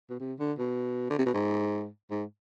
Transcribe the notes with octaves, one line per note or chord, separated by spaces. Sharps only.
B2
C3
D3
B2
D3
C3
B2
G#2
G#2